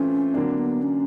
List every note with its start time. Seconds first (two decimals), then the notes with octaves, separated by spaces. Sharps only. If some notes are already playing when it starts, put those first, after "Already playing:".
Already playing: E3 A3 C4 C#4 F4
0.34 D3 F#3 A#3 C4 D4
0.59 B3
0.82 C#4